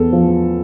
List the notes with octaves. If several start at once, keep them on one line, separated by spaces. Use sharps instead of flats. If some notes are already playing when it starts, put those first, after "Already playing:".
Already playing: E2 A4
F3